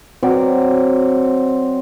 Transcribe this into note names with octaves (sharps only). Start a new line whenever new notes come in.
F#3 C4 D5